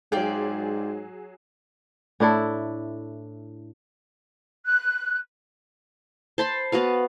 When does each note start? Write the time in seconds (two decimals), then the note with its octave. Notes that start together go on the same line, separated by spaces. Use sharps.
0.12 G#2 F#3 F4 G4 G#4 D5
2.20 A2 D4 E4 A4
4.66 F#6
6.38 C5 A5 B5 C6
6.72 B3 F#4 B4 F5